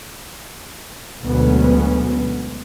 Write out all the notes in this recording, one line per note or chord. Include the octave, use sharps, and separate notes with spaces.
D2 B2 F#3 G#3 B3 C#4